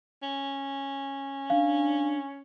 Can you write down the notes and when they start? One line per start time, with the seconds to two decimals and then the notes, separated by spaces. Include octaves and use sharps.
0.23 C#4
1.50 D4 F5